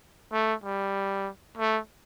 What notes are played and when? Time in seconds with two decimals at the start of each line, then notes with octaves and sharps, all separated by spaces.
0.32 A3
0.64 G3
1.57 A3